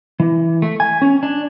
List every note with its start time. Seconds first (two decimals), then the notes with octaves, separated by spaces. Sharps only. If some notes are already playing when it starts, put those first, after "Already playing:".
0.20 E3
0.62 A3
0.80 G#5
1.02 C#4
1.23 D4